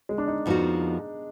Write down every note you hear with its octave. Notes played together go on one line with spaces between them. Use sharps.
G#3
D4
D#4
F2 F3 B3 D#4 F#4